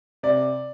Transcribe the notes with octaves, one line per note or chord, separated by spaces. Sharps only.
C3 D5